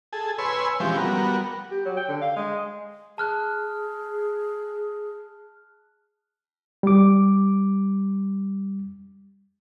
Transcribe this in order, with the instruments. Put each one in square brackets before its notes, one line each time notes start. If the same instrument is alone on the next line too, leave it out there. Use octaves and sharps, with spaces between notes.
[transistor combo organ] G#4 A4
B4 C#5 G#5 C6 E6
E3 F3 G#3 C4 C#4 G4
G3 B3 F#4 A#4
[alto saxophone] G4
F#3
G5
D3
F5
G#3
[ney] G#4 [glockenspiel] A5 F6 F#6
[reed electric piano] G3 D6